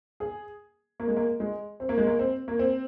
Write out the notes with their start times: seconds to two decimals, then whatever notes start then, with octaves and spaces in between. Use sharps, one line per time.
0.20 G#4
1.00 A#3
1.08 G#3
1.17 A#3
1.40 G#3
1.80 C4
1.89 A#3
1.98 G#3
2.07 A#3
2.19 C4
2.48 A#3
2.59 C4